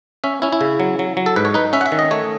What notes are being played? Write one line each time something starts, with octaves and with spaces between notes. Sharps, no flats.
C#4 E5
C#4 E4
E4
C#3
F#3
F#3
F#3
A4
G#2 B4
C#5
D#4 B4
C#4 E5
F#5
E5
D#3
D#5
A3 C#5